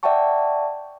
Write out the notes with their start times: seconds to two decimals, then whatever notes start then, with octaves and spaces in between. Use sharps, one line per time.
0.03 D5 E5 F#5 G5 A5 C#6